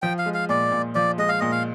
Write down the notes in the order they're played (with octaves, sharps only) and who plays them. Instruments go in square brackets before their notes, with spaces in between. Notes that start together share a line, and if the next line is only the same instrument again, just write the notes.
[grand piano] F3 [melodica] G5
[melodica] F5
[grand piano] G#3
[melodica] F5
[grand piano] A#2 [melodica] D5
[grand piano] A#2
[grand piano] F3 [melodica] D5
[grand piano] G#3 [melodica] D#5
[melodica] F5
[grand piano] A#2 [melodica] D#5
[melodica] F5